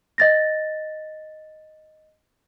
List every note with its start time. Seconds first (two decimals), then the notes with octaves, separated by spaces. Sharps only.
0.18 D#5 A6 A#6